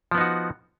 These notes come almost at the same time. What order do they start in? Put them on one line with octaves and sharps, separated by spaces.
F3 B3 D#4 F#4